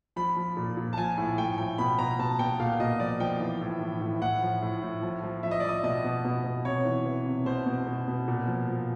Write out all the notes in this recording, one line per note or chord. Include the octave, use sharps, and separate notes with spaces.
F3 B5
F3
A#2
A#2
A5
F3 G#5
A2 G#5
A2 G5
F3 G5
B2 B5
B2 A#5
B2 A5
B2 G5
A#2 F5
A#2 D#5
F3 D5
F3 G5
E3
A2
E3
A2
A2 F#5
F3
A2
A2
F3
F3
F3 E5
D#5
D5
F3 D#5
B2 D#5
B2
B2
B2
C3 C#5
E3
E3
C3
B2 C5
B2
B2
B2
A#2
F3
F3